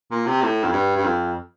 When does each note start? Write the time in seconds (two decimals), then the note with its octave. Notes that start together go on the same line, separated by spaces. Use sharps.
0.11 A#2
0.26 C3
0.42 A2
0.64 F2
0.72 G2
0.96 G2
1.04 F2